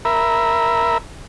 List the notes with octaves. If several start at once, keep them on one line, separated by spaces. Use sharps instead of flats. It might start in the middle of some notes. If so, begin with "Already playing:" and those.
A#4 E5 B5